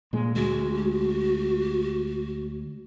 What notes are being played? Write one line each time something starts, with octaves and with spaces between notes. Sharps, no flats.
A#2 G#3
D2 G#3 F#4